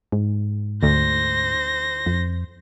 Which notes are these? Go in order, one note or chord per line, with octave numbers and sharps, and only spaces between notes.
G#2
D2 C5 A#6
F2